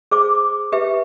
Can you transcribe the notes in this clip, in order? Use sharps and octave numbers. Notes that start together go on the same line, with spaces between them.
G#4 C5 D6
G4 B4 E5